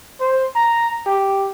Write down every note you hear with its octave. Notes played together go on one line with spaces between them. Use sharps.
C5
A#5
G4